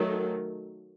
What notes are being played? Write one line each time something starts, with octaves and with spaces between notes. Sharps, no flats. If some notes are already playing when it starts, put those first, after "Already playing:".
Already playing: D#3 F#3 A3